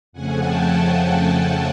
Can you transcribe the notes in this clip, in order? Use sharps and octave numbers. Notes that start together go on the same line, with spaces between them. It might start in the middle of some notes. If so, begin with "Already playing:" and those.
F2 C#3 F3 A3 F#5 G#5
G5 A5
F#5 G#5